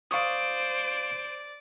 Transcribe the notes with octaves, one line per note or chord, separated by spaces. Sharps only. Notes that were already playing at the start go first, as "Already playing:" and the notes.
C5 D5 F5 C#6 D#6 D7